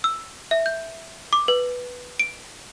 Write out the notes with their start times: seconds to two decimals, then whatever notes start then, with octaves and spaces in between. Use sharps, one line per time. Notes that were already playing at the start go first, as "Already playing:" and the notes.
0.04 E6
0.51 E5
0.66 G6
1.33 D6
1.48 B4
2.20 D7